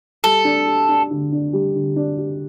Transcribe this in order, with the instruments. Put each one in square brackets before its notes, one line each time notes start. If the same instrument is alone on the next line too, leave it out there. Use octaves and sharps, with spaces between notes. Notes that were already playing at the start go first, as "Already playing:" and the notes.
[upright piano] G3 [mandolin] A4
[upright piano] D4
G4
D4
D3
D4
G3
D3
D4
G4